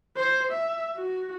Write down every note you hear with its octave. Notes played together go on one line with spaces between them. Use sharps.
C5
E5
F#4